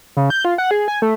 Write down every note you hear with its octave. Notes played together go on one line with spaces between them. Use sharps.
C#3
G6
F4
F#5
G#4
G#5
A3